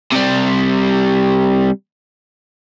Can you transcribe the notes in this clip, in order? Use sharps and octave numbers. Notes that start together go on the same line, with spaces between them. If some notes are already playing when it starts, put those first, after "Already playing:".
C3 G3